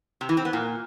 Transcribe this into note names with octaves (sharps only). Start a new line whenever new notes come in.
C3
E3
C4
B3
A#2